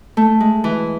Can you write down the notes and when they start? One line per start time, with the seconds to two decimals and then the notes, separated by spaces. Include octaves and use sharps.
0.17 A3
0.40 G#3
0.64 E3